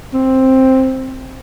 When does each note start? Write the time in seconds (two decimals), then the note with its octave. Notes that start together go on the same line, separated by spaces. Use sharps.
0.14 C4